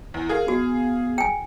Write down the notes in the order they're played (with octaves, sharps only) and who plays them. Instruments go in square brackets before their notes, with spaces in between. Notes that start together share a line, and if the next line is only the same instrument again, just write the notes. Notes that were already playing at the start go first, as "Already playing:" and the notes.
[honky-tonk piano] E2
[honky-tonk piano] G#4 F5 [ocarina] A#4
[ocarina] B3 [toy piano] F#4
[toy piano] G5 G#5